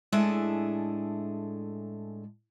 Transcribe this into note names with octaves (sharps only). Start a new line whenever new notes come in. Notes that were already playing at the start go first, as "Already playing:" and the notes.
A2 G#3 D4 G#4 A4 E5